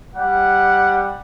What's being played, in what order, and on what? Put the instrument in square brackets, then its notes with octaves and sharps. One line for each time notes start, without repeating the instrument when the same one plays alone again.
[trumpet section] G3 F#5